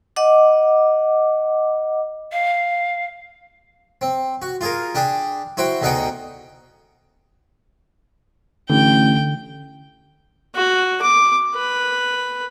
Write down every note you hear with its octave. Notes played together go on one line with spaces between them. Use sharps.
D#5 F#5 D6
F5
C4
F#4
F4 G#4 A#4
D4 G4 G#4
E4 F#4 C5 G5
D2 B2 D#4 G#4 F#5 G5
A1 D3 G5
F#4
D6
B4